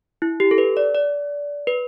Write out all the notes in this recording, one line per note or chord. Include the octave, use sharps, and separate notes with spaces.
E4
G4
A4
B4
D5
D5
B4